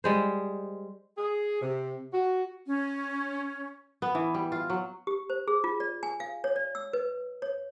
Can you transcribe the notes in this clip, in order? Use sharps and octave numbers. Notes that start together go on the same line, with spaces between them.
G3 G#3 C5
G#4
C3
F#4
C#4
B3
E3
G3
F4
F#3
G4
C5
G#4
F4
D5
G#5
F5
C#5
D5
E6
B4
C#5